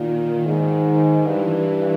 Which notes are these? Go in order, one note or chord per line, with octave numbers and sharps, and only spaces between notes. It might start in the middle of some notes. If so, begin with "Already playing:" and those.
Already playing: A#2 D#3
G#2
G2 E3